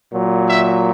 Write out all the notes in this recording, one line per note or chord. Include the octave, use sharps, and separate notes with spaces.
A#2 F#3
E5